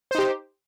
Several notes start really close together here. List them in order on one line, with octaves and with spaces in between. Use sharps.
C5 D#4 G4